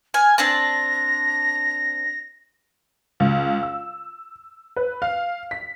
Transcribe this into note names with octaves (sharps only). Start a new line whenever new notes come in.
G#5 F6
C4 D4 A5 A#6
C#2
E6
B4
F5
B6